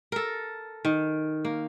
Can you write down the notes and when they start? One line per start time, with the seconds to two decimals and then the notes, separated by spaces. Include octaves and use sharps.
0.12 A4 A#4
0.85 D#3
1.45 A#3